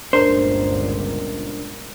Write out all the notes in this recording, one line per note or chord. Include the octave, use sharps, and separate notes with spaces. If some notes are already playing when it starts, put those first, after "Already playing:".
G1 C#2 A#2 D4 A#4 C5